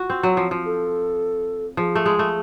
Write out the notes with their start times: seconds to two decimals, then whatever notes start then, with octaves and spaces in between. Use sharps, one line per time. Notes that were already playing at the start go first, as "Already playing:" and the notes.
Already playing: F4 F#4
0.10 C4
0.23 F#3
0.37 F3
0.51 F3
0.65 A4
1.77 F3 G#4
1.95 A3
2.06 G#3
2.19 A3